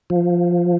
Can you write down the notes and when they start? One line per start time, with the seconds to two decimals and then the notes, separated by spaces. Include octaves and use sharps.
0.10 F3